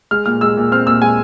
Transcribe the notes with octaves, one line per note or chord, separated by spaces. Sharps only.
G#3 F6
A#2 F6
G#3 E6
A#2
C4 F6
A#2 E6
G#3 G#5